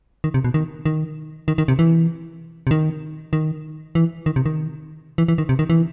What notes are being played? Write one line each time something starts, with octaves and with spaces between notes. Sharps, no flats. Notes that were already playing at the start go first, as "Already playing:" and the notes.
D#3
C3
B2
D#3
D#3
D#3
D#3
C3
E3
C3
D#3
D#3
E3
D#3
C3
D#3
E3
E3
D#3
C3
D#3
E3